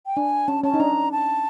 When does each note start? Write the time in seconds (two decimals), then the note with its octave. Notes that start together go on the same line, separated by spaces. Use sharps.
0.06 G5
0.17 D4 G#5
0.48 C#4 A5
0.64 C#4 A5
0.74 D#4
0.80 D4 A#5
1.12 A5